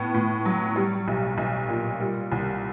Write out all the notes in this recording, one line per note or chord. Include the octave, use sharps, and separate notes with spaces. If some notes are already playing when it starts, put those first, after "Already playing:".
Already playing: A2 B3
A2
F#3
G3
B1
B1
A#2
G3
C2